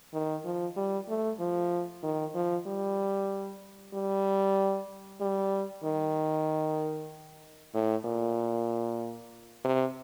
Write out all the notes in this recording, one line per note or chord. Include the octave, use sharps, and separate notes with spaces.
D#3
F3
G3
A3
F3
D#3
F3
G3
G3
G3
D#3
A2
A#2
C3